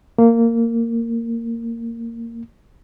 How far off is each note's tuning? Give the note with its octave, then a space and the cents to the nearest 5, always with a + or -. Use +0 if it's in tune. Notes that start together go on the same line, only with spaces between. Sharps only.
A#3 -15